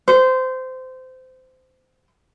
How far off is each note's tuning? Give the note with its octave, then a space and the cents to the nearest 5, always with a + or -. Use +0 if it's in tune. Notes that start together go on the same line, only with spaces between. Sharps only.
C5 -20